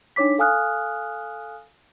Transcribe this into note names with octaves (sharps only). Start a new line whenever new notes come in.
D4 D#4 C#5 D6 B6
A4 F5 G#5 D#6 F6 F#6